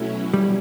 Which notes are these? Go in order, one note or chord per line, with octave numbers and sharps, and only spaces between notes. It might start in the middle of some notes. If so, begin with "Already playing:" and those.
Already playing: B2 F#3 A3 C#4 E4
G3